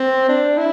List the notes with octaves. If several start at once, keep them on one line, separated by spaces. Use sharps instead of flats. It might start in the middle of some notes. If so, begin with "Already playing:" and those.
Already playing: C4
D4
E4